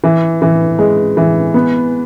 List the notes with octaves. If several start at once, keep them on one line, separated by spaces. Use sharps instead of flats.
E3
E3
G#3
E3
B3